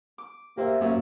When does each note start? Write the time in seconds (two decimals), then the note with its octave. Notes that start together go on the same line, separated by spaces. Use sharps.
0.18 D6
0.58 A#3 G4 C5 E5
0.80 F#2 A#3